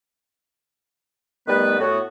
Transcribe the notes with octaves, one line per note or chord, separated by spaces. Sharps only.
D#3 G3 A3 B3 B4
A2 B3 F#4